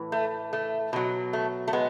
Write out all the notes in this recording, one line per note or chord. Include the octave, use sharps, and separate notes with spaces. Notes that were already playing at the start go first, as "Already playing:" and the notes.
Already playing: A2 E3
A3
A3
B2 F#3
A3
A3
G#3 B3